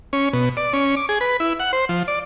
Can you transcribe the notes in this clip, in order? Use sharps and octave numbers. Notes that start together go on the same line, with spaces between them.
C#4
B2
D5
C#4
D6
G#4
B4
E4
F#5
C5
F3
D5